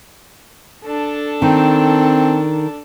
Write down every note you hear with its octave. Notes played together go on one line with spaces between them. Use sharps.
D4 A4
D#3 C4